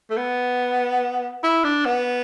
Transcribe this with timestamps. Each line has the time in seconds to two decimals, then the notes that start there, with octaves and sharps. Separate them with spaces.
0.10 A3
0.17 B3
1.43 E4
1.64 D4
1.85 B3